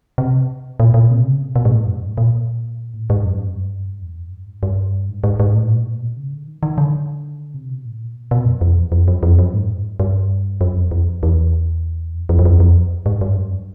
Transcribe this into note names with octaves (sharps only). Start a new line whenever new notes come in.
C3
A#2
A#2
C3
C#3
C3
B2
G#2
A2
F#2
G#2
A#2
A2
G#2
F#2
G2
F#2
E2
F2
G2
G#2
G2
G#2
G#2
G#2
A2
A#2
B2
C#3
D3
D#3
D#3
D3
C3
B2
A2
A#2
B2
F#2
F2
E2
F2
F#2
F2
F#2
G#2
G2
F#2
F2
F2
E2
F2
F2
F#2
F2
F2
G#2
G2
F#2